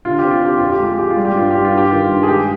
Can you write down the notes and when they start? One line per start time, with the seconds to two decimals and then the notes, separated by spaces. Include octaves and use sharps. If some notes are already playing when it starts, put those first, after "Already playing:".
0.05 D3 F4
0.18 G4
0.24 C4
0.31 F4
0.42 C4 G4
0.58 F2 F4
0.72 G4
0.79 G#3
0.85 F4
0.98 G#3 G4
1.10 F4
1.17 G3
1.25 G4
1.35 G2 F4
1.50 G2 G4
1.65 F4
1.73 G2 G4
1.91 D#3 F4
2.09 G2
2.23 G#4
2.28 G#3 G4